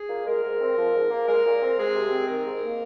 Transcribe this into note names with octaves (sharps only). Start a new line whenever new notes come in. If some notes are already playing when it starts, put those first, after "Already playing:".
Already playing: G#4
A#2
G#3 A#4
G#2
C4
F3
G#2
A#3
G#3 A#4
A#2
C4
G#3 G#4
C3
C4
D#3 A#4
G#2
A#3